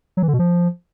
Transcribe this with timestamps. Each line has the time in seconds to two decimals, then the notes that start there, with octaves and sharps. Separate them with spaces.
0.17 F#3
0.23 E3
0.28 D3
0.34 B2
0.39 F3